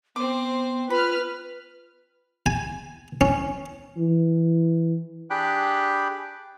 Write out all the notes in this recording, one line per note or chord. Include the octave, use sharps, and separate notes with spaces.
B3 C4 C5 D6
F4 B4 B5 F6
G#5
C#4
E3
D4 G4 G#4 G5 B5 F#6